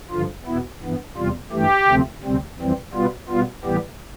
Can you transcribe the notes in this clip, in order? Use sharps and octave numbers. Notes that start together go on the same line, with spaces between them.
G2 D3 F3 F4
E2 B2 B3 E4
G2 E3 B3
E2 C3 G3 F4
G2 E3 A3 G4
D2 C3 F3 A3 C4
D2 C3 G3 C4
F2 E3 G3 C4
B2 G3 B3 F4
B2 G3 B3 F4
A2 E3 G3 B3 G4